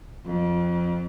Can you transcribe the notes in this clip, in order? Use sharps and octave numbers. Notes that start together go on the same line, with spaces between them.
F2